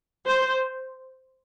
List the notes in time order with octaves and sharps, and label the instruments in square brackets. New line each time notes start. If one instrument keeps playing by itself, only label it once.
[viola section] C5